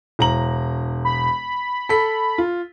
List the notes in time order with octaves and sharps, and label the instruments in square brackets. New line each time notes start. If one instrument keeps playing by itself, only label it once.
[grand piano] E1 A#5 F#7
[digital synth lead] B5
[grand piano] A4 B6
F4